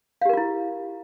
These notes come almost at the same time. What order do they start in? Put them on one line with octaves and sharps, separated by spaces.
F5 G4 A#4 F4 E4